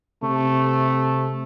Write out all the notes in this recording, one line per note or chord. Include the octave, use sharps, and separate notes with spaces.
C3 A3